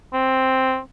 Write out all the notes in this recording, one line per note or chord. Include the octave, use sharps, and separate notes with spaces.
C4